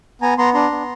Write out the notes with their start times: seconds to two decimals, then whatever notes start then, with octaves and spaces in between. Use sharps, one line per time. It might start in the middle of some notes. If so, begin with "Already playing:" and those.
0.22 B3 G#5 A#5
0.38 B3 A#5 C6
0.54 D4 A#5 C6
0.71 B3